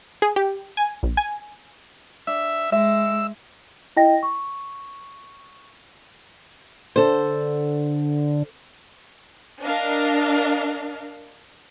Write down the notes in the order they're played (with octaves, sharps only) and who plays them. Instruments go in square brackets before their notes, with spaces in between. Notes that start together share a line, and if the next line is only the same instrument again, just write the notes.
[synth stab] G#4
G4
G#5
A#1
G#5
[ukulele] D4 [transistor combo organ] E5
[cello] G#3 [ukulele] E5 [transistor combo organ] E6
[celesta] E4 D#5 G5 A#6
C#6
[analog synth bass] D3 [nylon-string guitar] A4 C5
[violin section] D4 A#4 D#5 F5